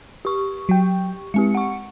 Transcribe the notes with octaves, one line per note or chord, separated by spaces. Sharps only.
G4 C#6
F#3 G5
G#3 C4 G4 C#7
F#5 C#6